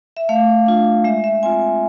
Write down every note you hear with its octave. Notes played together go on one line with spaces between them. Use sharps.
E5
A3 F5
D4 F4
G#3 E5
E5
C4 F4 G#5